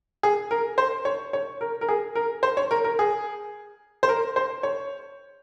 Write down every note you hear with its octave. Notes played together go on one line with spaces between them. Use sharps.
G#4
A#4
C5
C#5
C#5
A#4
A#4
G#4
A#4
C5
C#5
A#4
A#4
G#4
C5
A#4
C5
C#5